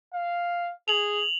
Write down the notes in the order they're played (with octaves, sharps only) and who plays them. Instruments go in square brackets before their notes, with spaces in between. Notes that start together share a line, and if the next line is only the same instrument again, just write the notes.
[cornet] F5
[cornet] G#4 [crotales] F7 F#7